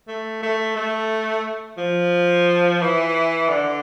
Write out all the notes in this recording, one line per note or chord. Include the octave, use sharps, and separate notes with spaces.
A3
A3
A3
F3
E3
D3